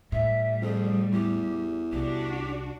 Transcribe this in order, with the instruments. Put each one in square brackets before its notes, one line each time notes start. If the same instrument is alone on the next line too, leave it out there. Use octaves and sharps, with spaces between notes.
[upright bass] A2 [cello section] G3 [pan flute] E5
[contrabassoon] F2 [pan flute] G#4
[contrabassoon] E2 [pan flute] G4
[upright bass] C2 [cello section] D4 F#4 [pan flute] G4